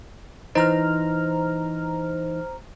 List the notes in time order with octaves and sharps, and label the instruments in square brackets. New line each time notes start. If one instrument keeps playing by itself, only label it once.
[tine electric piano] E3 D#4 [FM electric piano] C5 A#5 F6